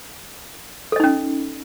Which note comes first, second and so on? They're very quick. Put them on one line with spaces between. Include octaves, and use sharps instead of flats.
A4 D#5 D#4 C#4